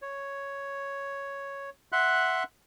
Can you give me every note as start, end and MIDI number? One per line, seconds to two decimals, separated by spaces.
0.02 1.70 73
1.92 2.43 76
1.92 2.43 78
1.92 2.43 84
1.92 2.43 90